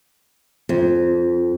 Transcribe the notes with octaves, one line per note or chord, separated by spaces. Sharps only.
F2